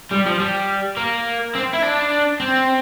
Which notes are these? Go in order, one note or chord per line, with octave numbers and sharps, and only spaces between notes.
G3
F3
G3
A#3
C4
E4
D4
C4